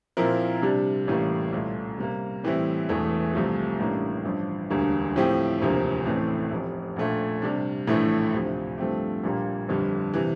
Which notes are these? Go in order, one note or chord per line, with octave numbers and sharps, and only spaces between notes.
A#2 F3 C4 E4 A#4
C3 G3 D4
A1 A2 E3 G3 A#3
C2 A#2 A3
C3 G3 A#3
A2 E3 G3 C4 E4
E1 E2 E3 A3
C2 C3 F3 A3
A1 A2 G3 A#3 D4
A1 G2 F3
E1 D2 D3 G3 A#3
A2 F3 C4 E4 G4
E1 D2 C3 F3 A#3
A1 A2 E3 A3 C4
F1 F2 C3
A#1 A#2 A3
C3 G3 D4
A#1 A2 E3 A3 E4
D2 C3 F3
G2 F3 A3 C4 G4
A#1 A#2 G3 A#3
G1 F2 D3 G3
C3 E3